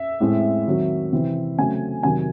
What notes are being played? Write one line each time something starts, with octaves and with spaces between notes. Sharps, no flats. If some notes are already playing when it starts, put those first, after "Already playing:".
Already playing: E5
A2 G#3 C4
D#3 F#3 C4
C3 E3 C4
C#3 F#3 A3 C4 G#5
C3 D#3 F#3 G#5